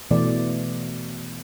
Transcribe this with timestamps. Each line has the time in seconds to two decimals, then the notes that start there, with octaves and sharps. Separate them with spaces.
0.11 B2 E3 A3 D5